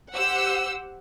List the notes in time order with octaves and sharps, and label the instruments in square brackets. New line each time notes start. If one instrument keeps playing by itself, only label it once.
[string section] G4 C5 F#5 E6